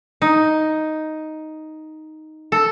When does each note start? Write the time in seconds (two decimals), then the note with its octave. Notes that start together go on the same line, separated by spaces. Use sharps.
0.22 D#4
2.52 A4